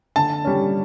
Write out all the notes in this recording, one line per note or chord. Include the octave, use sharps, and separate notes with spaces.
D3 A5
G3 C#4